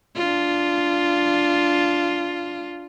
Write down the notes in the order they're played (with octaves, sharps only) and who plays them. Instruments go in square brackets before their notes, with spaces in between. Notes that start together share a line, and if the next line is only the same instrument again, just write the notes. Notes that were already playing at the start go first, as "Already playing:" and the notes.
[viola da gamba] D4 F4